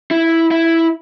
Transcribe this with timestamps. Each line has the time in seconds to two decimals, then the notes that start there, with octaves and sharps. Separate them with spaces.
0.11 E4
0.51 E4